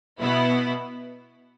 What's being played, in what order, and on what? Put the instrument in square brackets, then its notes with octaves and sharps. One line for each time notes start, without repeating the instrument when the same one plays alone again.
[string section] B2 B3 E4